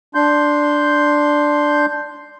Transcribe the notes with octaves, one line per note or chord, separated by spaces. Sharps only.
D4 C6 G6